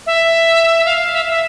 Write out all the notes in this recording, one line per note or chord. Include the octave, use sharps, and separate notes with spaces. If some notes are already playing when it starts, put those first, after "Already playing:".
E5
F5
E5
E5